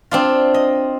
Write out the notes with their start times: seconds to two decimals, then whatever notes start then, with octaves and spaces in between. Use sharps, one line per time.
0.11 C4 D4 F4
0.54 D#5